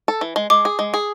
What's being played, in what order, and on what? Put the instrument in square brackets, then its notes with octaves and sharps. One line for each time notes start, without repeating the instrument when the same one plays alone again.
[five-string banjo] A4
E3
G#3
[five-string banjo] G#3 [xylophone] D6
[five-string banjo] G#4
G#3
G#4